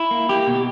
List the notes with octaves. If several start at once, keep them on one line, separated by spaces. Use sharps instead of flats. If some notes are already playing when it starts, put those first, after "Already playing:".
Already playing: E4
A#3
A#3 G4
B2